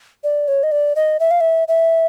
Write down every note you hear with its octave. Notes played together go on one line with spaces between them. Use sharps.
D5
C#5
D#5
D5
D#5
E5
F5
E5
E5